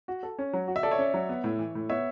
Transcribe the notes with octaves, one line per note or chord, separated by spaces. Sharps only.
F#4
A4
C#4
F#3
F#4
E5
A4 D5
C#5 E5
C#4
F#3
B3
A2
E3
A2
B3 C#5 E5